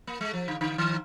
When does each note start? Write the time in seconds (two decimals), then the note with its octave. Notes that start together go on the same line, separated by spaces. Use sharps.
0.07 A#3
0.21 G#3
0.33 F3
0.48 D3
0.61 D3
0.78 D#3